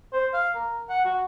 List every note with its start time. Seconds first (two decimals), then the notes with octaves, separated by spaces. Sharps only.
0.13 C5
0.34 F5
0.55 A#4
0.89 F#5
1.05 F#4